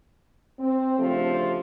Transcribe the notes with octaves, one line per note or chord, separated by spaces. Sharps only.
C4
D2 C#3 F3 A3 G4 A4